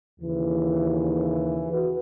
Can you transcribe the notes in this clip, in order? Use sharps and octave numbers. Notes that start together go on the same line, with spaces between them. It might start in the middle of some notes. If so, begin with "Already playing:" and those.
D#2 C#3 E3
F#4 B4